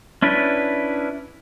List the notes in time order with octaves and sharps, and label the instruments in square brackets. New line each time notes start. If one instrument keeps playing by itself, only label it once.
[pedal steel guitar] C#4 D4 E4 B4